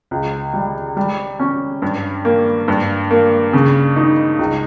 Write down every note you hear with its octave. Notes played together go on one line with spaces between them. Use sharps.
C#2
G3
G3
C#4
G2
A#3
G2
A#3
C#3
D#4
C#2